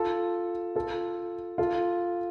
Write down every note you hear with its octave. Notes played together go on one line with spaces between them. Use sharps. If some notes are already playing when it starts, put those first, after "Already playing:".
Already playing: F4 A4
F4 A4
F4 A4